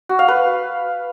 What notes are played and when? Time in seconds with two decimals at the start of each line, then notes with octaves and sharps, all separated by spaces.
0.09 F#4
0.19 F5
0.28 B4